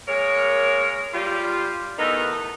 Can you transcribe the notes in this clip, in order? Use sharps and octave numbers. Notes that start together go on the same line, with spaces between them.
G#3 A#3 A#4 C#5
G3 F4
E2 D#3 A3 B3 D#4